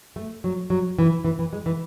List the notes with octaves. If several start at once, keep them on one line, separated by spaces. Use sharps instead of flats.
A3
F#3
F#3
E3
E3
E3
G#3
E3